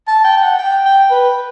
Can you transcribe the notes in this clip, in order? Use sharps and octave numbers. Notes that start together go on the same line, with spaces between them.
A5
G5
G5
F#5
G5
G5
B4